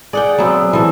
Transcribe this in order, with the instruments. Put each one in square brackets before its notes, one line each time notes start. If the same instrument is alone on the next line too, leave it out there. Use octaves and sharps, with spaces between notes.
[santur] G#4 [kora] D5 F#5 G5
[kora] F#3 B3 [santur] C4 E5 G#5
[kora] E3 A4